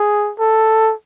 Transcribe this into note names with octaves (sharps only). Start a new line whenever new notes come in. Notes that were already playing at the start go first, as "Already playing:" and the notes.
Already playing: G#4
A4